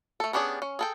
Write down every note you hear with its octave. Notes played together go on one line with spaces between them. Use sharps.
A3 A4
B3 C#4 D4 G4 G#4
C#4
G#4 A4 G5